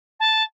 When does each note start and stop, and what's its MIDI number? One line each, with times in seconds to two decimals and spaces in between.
0.19 0.42 81